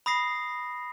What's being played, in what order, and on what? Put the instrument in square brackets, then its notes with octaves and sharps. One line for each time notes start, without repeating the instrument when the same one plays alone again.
[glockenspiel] B5 D#6 A#6 C7